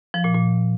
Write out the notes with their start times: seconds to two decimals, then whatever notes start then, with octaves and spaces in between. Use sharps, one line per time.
0.14 F3
0.24 A#2
0.34 A#2